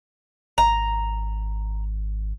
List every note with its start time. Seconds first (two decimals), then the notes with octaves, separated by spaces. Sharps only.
0.58 G#1 A#5